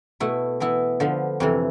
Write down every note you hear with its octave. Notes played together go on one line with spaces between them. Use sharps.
B2 A3 E4
E3 B3 E4
D3 F3 B3
F2 C3 E3